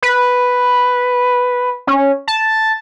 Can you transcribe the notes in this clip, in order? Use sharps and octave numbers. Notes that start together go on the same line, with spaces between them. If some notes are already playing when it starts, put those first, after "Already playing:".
B4
C#4
A5